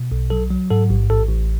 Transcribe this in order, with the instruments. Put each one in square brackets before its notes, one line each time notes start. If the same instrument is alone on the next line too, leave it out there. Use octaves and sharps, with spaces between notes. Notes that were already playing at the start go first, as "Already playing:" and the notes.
Already playing: [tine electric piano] B2
B1
F#3 A4
F#3
G#2 A4
A1
A1 A4
A1